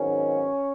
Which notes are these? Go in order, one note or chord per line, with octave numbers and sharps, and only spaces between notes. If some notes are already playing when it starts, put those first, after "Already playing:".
Already playing: G#1 G#2 D#3 F#3 B3 C#4